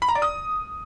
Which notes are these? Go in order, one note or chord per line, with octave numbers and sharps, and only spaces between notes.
B5
A#5
D5
D#6